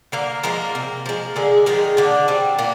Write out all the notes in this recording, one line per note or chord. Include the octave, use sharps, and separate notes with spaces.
D3 A#3 A#4
F3 G#3 A#3 A#4
C3
F3 G#3
D3 G#3 G#4
D#3 F3 G#3 D#4
A#2 D3 D4
G3 C4
A#2 A#3